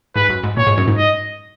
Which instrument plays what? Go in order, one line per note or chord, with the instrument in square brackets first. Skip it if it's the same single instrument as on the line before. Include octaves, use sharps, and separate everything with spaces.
[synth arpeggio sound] G#2 [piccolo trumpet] B4
[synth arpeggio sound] F#2
G#2
[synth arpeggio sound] A#2 [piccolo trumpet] C#5
[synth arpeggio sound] G#2
F#2
G#2
[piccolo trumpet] D#5